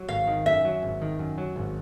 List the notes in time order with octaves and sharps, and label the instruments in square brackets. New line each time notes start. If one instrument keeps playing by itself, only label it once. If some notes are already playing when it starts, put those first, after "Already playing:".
Already playing: [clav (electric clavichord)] F#3
[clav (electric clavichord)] G#1 [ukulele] F5
[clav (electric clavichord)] D#3
[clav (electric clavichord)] F#2 [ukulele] E5
[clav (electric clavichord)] F#3
G#1
D#3
F#2
F#3
G#1